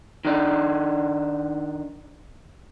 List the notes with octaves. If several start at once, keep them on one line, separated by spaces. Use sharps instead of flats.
D#3 D4 D#4